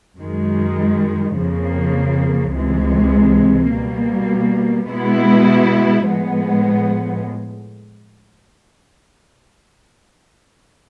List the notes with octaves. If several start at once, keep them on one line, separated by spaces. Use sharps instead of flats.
F#2 D#3 G#3
F2 C#3 F3 A#3
C#2 C3 E3 G#3
B2 G3 A#3
B2 G#3 B3 E4
A2 F3 G#3 B3